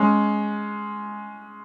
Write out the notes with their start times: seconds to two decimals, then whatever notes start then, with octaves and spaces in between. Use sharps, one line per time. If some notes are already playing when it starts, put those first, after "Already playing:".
Already playing: G#3 C#4